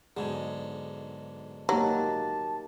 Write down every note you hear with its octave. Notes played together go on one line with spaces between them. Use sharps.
B1 G#2 D3 G#4
F#3 A#3 D#4 G4 A5